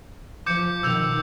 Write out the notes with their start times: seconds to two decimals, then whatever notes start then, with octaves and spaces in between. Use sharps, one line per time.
0.46 F3 D6 G6 C#7
0.83 B2 D#3 F3 E6 G6 F7